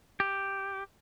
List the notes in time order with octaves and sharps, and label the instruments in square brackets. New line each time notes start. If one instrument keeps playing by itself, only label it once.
[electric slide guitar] G4